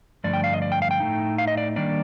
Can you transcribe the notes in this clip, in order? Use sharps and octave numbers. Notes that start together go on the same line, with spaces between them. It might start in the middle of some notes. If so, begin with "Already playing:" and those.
G2 D3 F3 A3 D5
G5
F5
D#5
D5
G5
F5
G5
A2 A3 D#4
F5
D#5
D5
D#3 G3 A#3 D4 D5